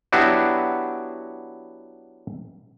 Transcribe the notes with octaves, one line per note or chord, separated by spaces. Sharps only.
F#3 B3 D4 E4 F#4 G4